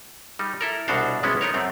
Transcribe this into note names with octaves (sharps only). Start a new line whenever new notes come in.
G3 D#4
E4 A4 A#4
C2 B2 D4 F#4 C5 F5
B1 G3 G#3 B3 C#4 E4
B3 D#4 A#4 C#5
F#2 A3 C4